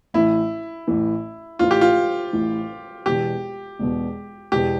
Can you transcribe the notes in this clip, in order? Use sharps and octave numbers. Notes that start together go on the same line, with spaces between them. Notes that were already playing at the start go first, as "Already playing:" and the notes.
A1 A2 E3 E4
A1 A2 E3
A1 A2 E3 F4
G4
F4
A1 A2 E3
E1 E2 B2 G4
E1 E2 B2
E1 E2 B2 G4